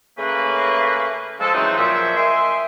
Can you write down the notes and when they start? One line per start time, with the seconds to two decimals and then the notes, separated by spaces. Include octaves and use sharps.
0.18 C#3 A3 A#3 C#4 G#4 B4
1.40 F3 G#3 A4
1.54 C#3 E3 F#3 G#3 C4 D#4
1.77 A#2 F3 F#3 E5
2.16 D#5 E5 G5 G#5 C6